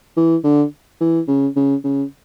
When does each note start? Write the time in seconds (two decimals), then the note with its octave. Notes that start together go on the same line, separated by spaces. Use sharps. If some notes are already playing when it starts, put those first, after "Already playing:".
0.17 E3
0.44 D3
1.01 E3
1.28 C#3
1.56 C#3
1.84 C#3